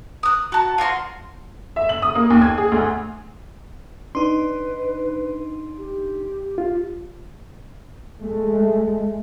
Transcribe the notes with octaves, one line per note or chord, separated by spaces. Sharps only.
D#6 F#6
F#4 A5
F4 F#4 A5 C6
E5
F#7
D#6
A#3
D#2
G#6
G#4
D2
D4 D#4 B4 C6
G4
F4
G#3 A3